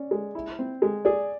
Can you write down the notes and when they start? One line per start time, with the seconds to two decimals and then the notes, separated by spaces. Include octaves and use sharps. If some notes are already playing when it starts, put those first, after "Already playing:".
Already playing: C#4 D5
0.11 G#3
0.35 E4
0.59 C4
0.82 G#3
1.05 G#4 D5